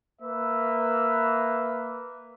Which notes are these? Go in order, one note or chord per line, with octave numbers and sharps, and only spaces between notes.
A#3 B4 E5